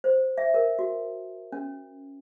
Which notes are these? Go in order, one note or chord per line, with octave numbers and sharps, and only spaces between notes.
C5
E5
A#4
F#4
C#4